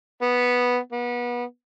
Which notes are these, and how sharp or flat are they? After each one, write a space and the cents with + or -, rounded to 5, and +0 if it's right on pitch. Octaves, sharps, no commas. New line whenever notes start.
B3 -5
B3 -30